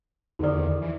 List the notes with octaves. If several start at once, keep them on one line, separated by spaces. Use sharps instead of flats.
E2 D3 D#3 D#4 D5
E3